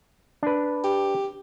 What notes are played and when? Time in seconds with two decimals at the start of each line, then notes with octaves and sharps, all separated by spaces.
0.43 D4 B4
0.84 G4